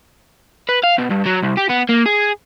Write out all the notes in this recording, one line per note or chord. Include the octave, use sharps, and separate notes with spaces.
B4
F5
B2
G2
F#3
C2
G4
B3
A#3
G#4